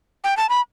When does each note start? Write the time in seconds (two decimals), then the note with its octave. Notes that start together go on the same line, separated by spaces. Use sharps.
0.24 G5
0.37 A5
0.49 B5